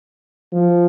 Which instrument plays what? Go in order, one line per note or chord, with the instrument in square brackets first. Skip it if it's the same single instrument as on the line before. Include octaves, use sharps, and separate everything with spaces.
[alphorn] F3